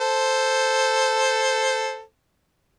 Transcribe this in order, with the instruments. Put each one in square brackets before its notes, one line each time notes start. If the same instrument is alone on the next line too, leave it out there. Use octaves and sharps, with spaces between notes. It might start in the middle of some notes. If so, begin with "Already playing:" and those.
[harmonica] A4 C5